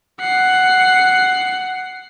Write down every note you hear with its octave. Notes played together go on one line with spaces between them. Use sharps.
F#5 C7